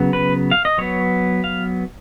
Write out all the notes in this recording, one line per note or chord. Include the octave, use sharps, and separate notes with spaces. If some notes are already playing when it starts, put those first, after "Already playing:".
Already playing: C#3 F#3 B3
B4
F5
D#5
F#3 B3 C#5
F5